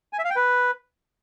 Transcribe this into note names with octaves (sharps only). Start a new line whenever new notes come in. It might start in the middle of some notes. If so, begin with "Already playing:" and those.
G#5
E5
F5
G5
B4